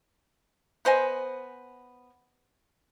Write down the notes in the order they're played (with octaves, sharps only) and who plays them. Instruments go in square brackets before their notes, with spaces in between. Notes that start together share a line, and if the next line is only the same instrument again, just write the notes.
[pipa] B3 C5 D#5 G#5